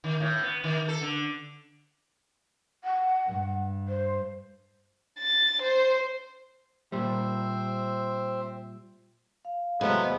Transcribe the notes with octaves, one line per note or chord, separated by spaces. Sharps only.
D#3
A2
B3
D#3
A4
D3
F#5
G2
C5
A6
C5
A#2 G3 C4 C5 E5
F5
E2 C3 F#3 G#3 A3 B3